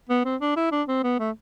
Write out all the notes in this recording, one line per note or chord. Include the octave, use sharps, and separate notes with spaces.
B3
C4
D4
E4
D4
C4
B3
A3